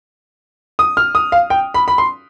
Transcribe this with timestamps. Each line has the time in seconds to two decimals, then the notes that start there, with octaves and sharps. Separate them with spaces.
0.79 D#6
0.97 F6
1.15 D#6
1.32 F5
1.50 G5
1.74 B5
1.88 B5
1.98 C6